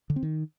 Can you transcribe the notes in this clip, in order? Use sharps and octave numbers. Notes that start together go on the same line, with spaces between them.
D3
C4
D#3